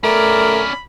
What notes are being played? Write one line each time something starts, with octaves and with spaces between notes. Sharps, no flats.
A3 C#4 A#4 D5 B5